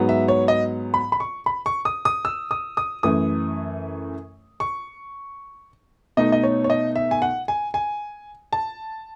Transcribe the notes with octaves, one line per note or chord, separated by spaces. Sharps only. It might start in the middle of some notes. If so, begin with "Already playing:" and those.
Already playing: G#2 F#3 B3
E5
C#5
D#5
B5
B5
C#6
B5
C#6
D#6
D#6
E6
D#6
D#6
F#2 E3 A3 D#6
C#6
B2 A3 D#4 D#5
D#5
C#5
C#5
D#5
E5
G#5
F#5
G#5
G#5
A5